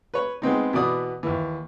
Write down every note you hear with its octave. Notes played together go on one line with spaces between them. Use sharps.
B4 C#5
G#3 B3 C4 D#4
B2 E3 B3 D5 D#6
D#2 E3